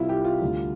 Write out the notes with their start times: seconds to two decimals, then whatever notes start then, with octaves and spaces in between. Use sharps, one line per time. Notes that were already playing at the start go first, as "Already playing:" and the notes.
Already playing: C2 C3 G3 E4 F4
0.09 G4
0.25 F4
0.41 D2 D3 G3